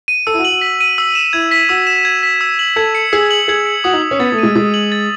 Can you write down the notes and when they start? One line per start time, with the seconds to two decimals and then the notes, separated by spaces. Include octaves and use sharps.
0.08 D#7
0.27 A4 E6
0.34 E4
0.39 F#4
0.45 F#7
0.50 F#4
0.61 B6
0.81 D#7
0.98 E6
1.15 E7
1.33 E4 G#6
1.51 B6
1.69 F#4 E6
1.87 E7
2.05 G#6
2.23 B6
2.41 E6
2.59 F#7
2.76 A4 G#6
2.95 C#7
3.13 G#4 E6
3.31 F#7
3.48 G#4 G#6
3.66 C#7
3.84 F#4 D#6
3.93 D#4
4.02 F#7
4.11 C#4
4.19 B3 A6
4.32 A3
4.38 G#3 D#7
4.56 G#3 D#6
4.74 F#7
4.92 A6